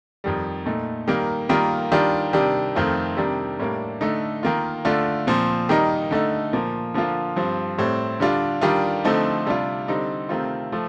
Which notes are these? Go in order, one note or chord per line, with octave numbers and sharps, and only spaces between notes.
F2 D#3 G3
A#2 A3 D#4
D#3 G3 A#3
D#3 G3 A#3 F4
D#3 G3 D4 F4
C3 D#3 G3 D4
F2 D#3 A3 C4 F4
C3 D#3 G3 D4
A2 G3 A#3 D4
D3 A3 D#4
D#3 A#3 F4
D3 A3 D4 F4
A#2 F3 C4
D#3 G3 A#3 D#4
D3 A3 D#4
A#2 F3 A#3
D3 F3 A#3 F4
G2 F3 C4
A2 G3 C4
D3 G3 D4 F4
D#3 G3 D4 F4
D3 F3 A3 C4 D#4
C3 G3 D4 F4
D3 G3 C4 D#4
C3 D#3 A3 C4 F4
F3 A3